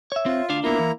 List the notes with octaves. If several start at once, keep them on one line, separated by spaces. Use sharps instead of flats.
C#5 E5
C4 F4
D2 D4 F5
A#3 B3 E4 F4 A#5
E3